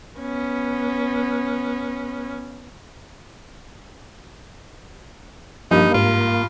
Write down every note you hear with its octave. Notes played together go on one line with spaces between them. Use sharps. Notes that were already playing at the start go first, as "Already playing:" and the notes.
B3 C#4
G2 F3 A#3 D#4
G#2 F4